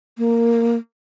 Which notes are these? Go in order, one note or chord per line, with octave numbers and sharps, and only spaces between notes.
A#3